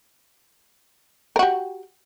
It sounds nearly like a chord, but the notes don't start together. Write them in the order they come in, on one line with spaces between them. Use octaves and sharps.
A#4 F#4 G4